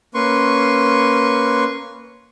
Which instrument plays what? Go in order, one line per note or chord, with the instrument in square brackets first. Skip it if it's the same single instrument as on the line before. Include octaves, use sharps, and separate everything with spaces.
[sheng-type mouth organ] A#3 C#4 B4 C6 C#6